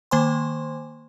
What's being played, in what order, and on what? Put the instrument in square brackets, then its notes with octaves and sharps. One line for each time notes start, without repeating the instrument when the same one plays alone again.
[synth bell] D#3 A#3 C5 G#5 C6